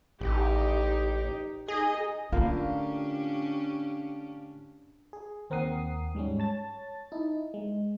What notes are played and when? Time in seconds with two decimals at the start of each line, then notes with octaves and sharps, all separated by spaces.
0.21 A1 D#4 G4
1.68 D#4 G#4 D#5
2.33 A2 D3 A#3 C#4 D4 F4 G4 F5
5.13 G#4
5.50 D#2 C4 A#4 F#5 D#6 C7
6.15 G#2 G3 G#3 C#4
6.39 C#5 A5 A6
7.12 D#4 E4
7.54 G#3